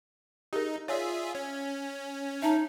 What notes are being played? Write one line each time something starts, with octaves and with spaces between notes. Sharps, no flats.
D#4 G4 G#4 A#4
F4 G#4 C#5 D5 E5
C#4
D#4 E5 A5 A#5